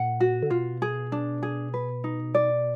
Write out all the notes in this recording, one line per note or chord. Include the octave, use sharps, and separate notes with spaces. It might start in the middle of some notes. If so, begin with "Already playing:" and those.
Already playing: A#2 F#5
F#4
D3
B2 F4
G#4
D4
G#4
B4
D#4
D5